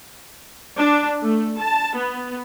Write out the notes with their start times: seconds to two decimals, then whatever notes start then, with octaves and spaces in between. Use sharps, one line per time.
0.78 D4
1.22 A3
1.57 A5
1.94 B3